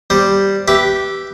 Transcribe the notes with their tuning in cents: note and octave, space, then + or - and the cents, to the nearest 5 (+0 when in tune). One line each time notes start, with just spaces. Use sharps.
G3 +0 C5 +0
G4 -10 B4 +0 E5 +0